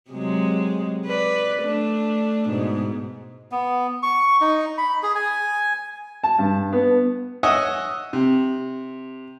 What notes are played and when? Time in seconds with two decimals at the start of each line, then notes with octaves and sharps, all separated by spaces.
0.10 C3 F#3 G#3
1.06 B4 D5
1.60 A3 D4
2.49 G#2 B2
3.52 B3
4.03 C#6
4.41 D#4
4.78 B5
5.03 G#4
5.15 G#5
6.24 A5
6.39 G2
6.73 B3
7.43 C#5 D#5 E5 F#5 G#5 D#6
8.13 C3